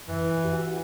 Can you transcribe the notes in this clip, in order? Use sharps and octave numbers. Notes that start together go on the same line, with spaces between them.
F#2 E3
F#4 G4 F#5